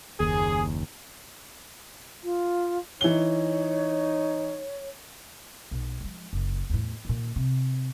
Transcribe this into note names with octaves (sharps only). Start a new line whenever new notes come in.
F#1 D#2 G#4
F4
E3 D#4 C#5 G7
B1
F3 G#3
F#1
E2 A2
A#2 D#3
C3